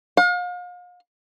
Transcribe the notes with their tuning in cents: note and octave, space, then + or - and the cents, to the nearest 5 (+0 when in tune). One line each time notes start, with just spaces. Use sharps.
F5 +40